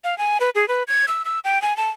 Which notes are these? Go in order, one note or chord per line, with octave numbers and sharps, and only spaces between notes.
F5
G#5
B4
G#4
B4
G#6
E6
E6
G5
G#5
A5